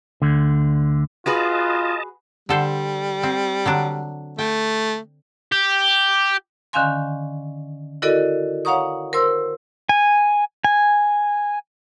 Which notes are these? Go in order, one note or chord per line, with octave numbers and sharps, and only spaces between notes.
D2 D3
F4 F#4 G#4 B4 D#5 A5
D3 G3 A4 C5
C4
D3 F#3 D4
A3 G5
G4
D3 D#3 C#4 F5 G#5 C6
E4 F#4 A4 A#4 D5 D#5
C#5 F5 F#5 A#5 C#6 D#6
A#4 C5 C6 E6
G#5
G#5